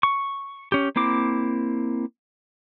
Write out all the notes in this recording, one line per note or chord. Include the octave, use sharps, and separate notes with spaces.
C#6
C#4 G4
A#3 C4 E4 D6